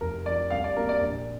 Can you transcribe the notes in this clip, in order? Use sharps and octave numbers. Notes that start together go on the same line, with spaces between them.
F1 A#4
F2 F3 D5
C2 F5
D5
C3 A#3 A#4
D5
A#1